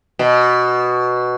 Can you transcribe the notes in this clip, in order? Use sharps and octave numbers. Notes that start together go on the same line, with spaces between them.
B2